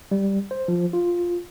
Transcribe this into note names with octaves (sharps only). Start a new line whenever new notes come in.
G3
C5
F3
F4